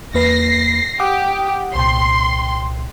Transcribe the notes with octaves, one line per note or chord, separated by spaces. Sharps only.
E2 A#3 B4 A#6 C7
G4 F#5 D6 D#6
C2 A#2 G5 C6